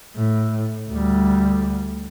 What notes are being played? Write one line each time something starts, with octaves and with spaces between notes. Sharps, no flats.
A2
D2 G3